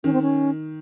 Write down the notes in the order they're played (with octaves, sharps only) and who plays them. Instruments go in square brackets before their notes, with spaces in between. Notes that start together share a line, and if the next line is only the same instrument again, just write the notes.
[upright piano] D#3 [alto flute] C#4
[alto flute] C4
C#4